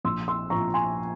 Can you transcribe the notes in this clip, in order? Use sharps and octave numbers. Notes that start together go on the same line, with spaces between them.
A#1 C6 E6
C6 E6
A#2 F3 A#5 C#6
G#5 C6